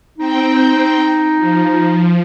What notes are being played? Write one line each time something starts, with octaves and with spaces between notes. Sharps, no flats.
C4 D#4 G5
F3